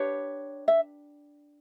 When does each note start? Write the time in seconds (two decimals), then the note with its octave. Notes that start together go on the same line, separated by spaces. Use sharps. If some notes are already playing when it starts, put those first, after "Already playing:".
Already playing: D4 G4 B4 C#5
0.68 E5